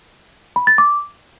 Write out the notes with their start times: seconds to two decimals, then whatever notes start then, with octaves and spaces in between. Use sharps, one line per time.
0.56 B5
0.67 A6
0.78 D6